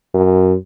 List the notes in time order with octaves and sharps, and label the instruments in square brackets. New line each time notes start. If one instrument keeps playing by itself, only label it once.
[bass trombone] F#2